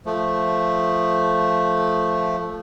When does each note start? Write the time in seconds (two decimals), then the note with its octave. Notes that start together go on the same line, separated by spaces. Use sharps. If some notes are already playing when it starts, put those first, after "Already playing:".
0.06 F3 A3